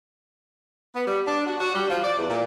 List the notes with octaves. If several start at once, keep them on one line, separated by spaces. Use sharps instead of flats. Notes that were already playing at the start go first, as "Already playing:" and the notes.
B3
G3
D4
F#4
F#4
G3
F3
D5
E2
A#2